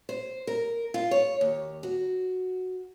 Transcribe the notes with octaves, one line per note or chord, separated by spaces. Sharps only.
C5
A#4
F4
C#5
D#2
F#4